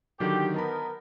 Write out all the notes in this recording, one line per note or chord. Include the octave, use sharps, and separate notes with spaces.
D3 D#3 F#3 G4
B3 A#4 D#5 A5 B5